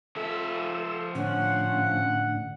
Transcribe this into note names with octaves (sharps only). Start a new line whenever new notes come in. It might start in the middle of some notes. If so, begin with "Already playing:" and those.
F3 A4 E5 E6
A2 D3 C#4 F#5